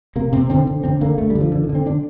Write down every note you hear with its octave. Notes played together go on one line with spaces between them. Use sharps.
C3 A#3
C3 C4
D3 C4
D3
D3 C4
D3 A#3
D3 A3
G3
D3
F3
D3
D#3
D3
C4
D3 D4